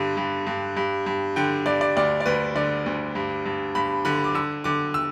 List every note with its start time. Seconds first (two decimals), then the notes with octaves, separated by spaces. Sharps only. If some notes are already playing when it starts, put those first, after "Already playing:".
Already playing: G2 D3
0.17 G2
0.47 G2
0.77 G2
1.06 G2
1.36 D3 G5
1.66 G2 D5
1.81 D5
1.97 D2 D5
2.20 D5
2.26 D2 B4
2.56 D3 D5
2.86 D2
3.15 G2
3.46 G2
3.75 G2 B5
4.05 D3 B5
4.24 D6
4.34 D3 E6
4.64 D3 D6
4.94 E6